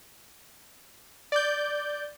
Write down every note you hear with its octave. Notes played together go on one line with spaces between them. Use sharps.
D5 G6